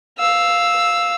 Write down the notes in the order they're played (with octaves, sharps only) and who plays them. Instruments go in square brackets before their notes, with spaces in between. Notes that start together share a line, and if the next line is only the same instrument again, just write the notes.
[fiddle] F5 E6